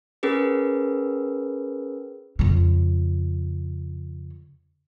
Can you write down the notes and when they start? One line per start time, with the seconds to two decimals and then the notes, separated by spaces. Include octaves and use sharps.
0.23 C#4 G#4 A#4 B4
2.39 F2 C#3